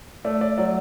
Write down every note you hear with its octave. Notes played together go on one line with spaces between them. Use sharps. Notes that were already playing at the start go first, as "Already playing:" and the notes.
A3 D5
D5
F#3 D5